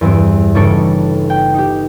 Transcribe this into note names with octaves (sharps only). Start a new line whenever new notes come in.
E2 G2 C4 D7
G1 C#3 D#4 A4 C#5 D7
G5
D#4 G4